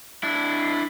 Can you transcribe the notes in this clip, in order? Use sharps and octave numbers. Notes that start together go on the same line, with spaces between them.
D4 E4